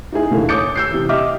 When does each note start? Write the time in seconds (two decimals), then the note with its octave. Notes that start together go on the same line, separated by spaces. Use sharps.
0.12 D#4 E4 G#4
0.30 D#2 A#2 D3 E3 A#3
0.49 C#5 D6 D#6 G6 A6 C#7
0.76 E6 G6 C7
0.91 C3 E3
1.09 G4 D#5 E5 D6 F6